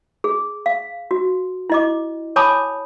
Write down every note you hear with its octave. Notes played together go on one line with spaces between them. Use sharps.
G#4
F5
F#4
E4 D#5 D6
C#5 G#5 A5 B5 D6 D#6